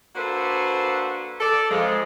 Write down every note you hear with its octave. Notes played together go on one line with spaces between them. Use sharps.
A#3 D4 F#4 A4 B4 C5
A4 D5
F2 F3 G#3